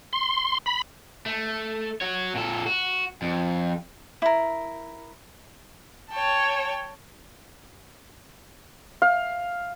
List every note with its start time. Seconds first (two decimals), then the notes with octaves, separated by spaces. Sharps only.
0.13 C6
0.66 B5
1.26 A3
2.01 F#4 C#5
2.35 A#2 A4
2.66 F#4
3.22 F2
4.22 E4 A#4
6.12 C#5 G5 A5
9.02 F5